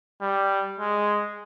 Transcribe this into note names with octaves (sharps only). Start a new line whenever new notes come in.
G3
G#3